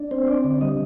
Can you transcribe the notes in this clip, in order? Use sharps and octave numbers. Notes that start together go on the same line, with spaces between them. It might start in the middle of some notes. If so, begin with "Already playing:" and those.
Already playing: D4
C4 C5
C4 D5
D3
G3 D#5